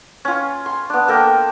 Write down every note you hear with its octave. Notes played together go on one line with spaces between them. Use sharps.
C#4 F4
C6
B3 D4
A#3 A4 A#4 G5